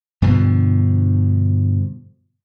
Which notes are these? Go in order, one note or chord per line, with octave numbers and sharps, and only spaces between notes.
G2 B2 D3 F3